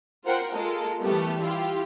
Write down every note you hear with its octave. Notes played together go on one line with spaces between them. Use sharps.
F4 A#4 C5 F#5 G5
G#3 A#3 F4 A4
E3 G3 A3 B3 G4
E4 F4 G4